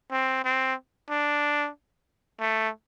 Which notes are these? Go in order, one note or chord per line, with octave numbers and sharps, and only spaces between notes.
C4
C4
D4
A3